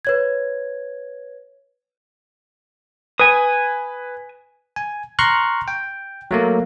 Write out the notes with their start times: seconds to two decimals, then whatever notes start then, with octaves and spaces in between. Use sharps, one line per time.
0.05 B4 C#5 G#6
3.19 B4 G#5 D#6
4.76 G#5
5.19 A#5 C6 C#6 F6 F#6
5.68 G5
6.31 F#3 A3 A#3